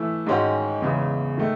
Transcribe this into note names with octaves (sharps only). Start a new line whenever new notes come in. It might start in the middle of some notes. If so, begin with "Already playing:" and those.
Already playing: E3 A3 E4
G#2 D#3 G#3 C#4 F#4
E2 C#3 G#3
D#3 A3